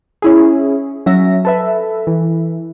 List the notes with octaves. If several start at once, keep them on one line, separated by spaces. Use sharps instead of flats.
C#4 E4 G#4
F#3 C#4 E5 A#6
A4 B4 E5
E3